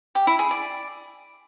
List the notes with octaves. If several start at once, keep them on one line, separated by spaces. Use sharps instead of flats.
G4
E4
G#4
D5